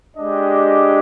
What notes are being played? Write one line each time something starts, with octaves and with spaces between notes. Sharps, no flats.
G#3 D4 G4 D#5